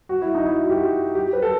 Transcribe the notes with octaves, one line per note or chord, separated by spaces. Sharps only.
F#4
E4
D#4
E4
F#4
G4
F#4
G4
B4
A4